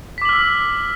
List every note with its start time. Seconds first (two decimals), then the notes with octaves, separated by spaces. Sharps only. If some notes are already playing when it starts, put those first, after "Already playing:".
0.18 B6
0.22 D6
0.25 F#7
0.29 F6
0.33 E6